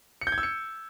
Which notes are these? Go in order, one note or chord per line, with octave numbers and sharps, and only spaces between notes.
C#7
G6
G#6
E6
C#7